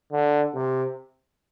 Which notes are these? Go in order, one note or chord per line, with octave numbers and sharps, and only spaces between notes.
D3
C3